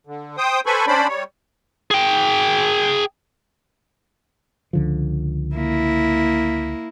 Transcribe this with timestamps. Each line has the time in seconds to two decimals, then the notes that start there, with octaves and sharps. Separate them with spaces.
0.07 D3
0.38 C5 G5 D#6
0.66 A4 B4 C5 G#5 B5 C#6
0.87 C#4 D4 C5 D5 B5
1.08 G3 C#5
1.91 G#4 G5
4.73 C#2 D3 F3
5.55 A#3 E4